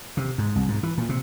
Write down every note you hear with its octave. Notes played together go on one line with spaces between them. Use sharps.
C3
G#2
C2
G#2
E3
A#2
C3